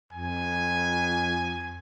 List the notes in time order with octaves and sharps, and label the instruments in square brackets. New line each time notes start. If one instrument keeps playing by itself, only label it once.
[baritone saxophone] F2 [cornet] G#5